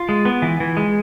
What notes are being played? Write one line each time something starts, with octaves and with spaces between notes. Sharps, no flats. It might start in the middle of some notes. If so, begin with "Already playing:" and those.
Already playing: F4
G#3
B3
E3
E3
G#3